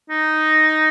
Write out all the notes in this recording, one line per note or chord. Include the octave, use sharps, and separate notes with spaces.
D#4